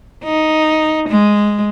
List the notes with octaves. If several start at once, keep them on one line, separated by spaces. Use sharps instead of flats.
D#4
G#3